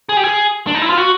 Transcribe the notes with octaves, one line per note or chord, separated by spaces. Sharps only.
G#4
G4
G#4
D4
D#4
E4
F4
F#4